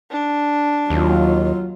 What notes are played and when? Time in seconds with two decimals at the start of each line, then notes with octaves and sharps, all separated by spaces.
0.11 D4
0.90 D#2 F#3 F4